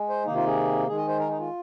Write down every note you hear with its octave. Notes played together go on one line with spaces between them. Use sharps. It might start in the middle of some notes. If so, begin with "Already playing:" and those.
Already playing: G#3
C5
C3 D#3 A#3 D#4
F4
G#4
D#3 G#3 G#4
D#5
C5
A#4
D#4
F4